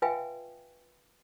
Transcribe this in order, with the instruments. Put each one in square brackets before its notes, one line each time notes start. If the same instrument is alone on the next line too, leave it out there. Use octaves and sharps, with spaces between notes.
[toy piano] F4 B4 E5 F5 G5 G#5